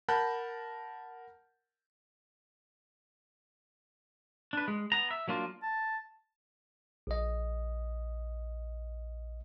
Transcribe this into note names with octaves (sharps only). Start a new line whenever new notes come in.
A#4 F#5 A5 B5 F#6 G6
D4 B4
G#3
B3 A#5
E5
F#3 A#3 D4 F4
A5
A#1 D#5